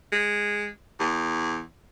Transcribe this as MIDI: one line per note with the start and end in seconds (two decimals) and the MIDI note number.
0.12 0.68 56
1.00 1.61 40